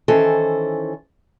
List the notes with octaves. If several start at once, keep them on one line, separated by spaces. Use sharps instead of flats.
D#3 E3 C#4 A4 C5